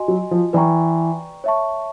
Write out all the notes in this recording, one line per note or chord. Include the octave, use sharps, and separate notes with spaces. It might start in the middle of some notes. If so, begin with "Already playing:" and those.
Already playing: F#4 D#5 G#5 C6
F#3
F3
E3 B4 D5 G5 A#5 C#6
C#5 E5 A5 C#6